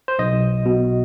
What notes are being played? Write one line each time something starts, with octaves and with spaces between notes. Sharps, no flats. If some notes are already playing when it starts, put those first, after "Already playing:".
C5
B1 D#5
B2